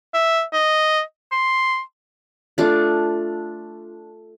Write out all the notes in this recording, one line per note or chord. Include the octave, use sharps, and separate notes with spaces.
E5
D#5
C6
A3 D4 F4